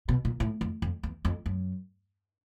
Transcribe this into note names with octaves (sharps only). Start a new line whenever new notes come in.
B2
A#2
A2
F2
F2
E2
F2
F#2